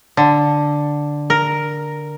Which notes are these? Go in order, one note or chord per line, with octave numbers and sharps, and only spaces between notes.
D3
A#4